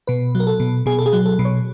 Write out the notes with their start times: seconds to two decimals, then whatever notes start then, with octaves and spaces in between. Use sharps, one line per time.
0.07 B2 B4
0.35 F#3
0.40 A#4
0.47 A4
0.60 B2
0.86 B2 G#4
0.99 A4
1.06 G#4
1.13 F#3
1.26 A4
1.39 B2
1.45 C#5